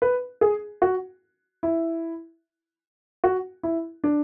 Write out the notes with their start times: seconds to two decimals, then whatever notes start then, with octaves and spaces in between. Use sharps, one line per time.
0.02 B4
0.41 G#4
0.82 F#4
1.63 E4
3.24 F#4
3.63 E4
4.04 D4